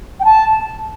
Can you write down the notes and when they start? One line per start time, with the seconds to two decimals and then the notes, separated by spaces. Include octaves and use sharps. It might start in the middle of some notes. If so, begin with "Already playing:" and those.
0.20 G5
0.25 A5